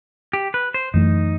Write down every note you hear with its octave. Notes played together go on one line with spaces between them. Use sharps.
G4
B4
C5
F#2 E3 A3 D#4